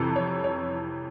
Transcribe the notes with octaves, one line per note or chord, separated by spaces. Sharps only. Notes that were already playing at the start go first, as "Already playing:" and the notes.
Already playing: F2 C3 E3 A4
C#5
C#5